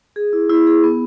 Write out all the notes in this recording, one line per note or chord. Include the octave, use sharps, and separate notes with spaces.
G#4
E4
E4
G#4
B3